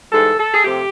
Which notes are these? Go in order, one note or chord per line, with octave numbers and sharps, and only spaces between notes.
G#2 E3 G3 A4
A4
G#4
C3 F3 A3 G4